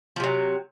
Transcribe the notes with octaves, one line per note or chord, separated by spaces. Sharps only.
C3 F3 F#3